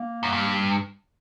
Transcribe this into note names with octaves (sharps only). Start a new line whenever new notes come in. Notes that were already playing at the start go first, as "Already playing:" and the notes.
Already playing: A#3
F#2
G2